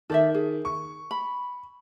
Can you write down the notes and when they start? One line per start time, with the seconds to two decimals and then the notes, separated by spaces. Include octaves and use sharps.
0.10 D#3 A4 D5 E5
0.35 G#4
0.65 C#6
1.11 B5